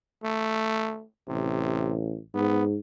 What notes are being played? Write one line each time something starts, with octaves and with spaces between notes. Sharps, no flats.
A3
A1 C3
G#2 B3